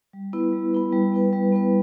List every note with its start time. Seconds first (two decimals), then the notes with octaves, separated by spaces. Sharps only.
0.13 G3
0.33 B3 E4 B4
0.53 G3
0.73 B3 E4 B4
0.93 G3
1.12 B3 E4 B4
1.33 G3
1.52 B3 E4 B4